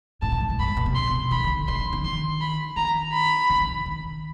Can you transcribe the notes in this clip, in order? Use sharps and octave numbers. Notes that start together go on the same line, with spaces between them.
A2 A5
A#2
A2
G#2
G2 B5
G#2
A#2
C3
C6
B2
D#3 B5
D3
D#3 C6
D3
D3
D#3 C6
B5
D#3 A#5
B5
D3
D#3
D#3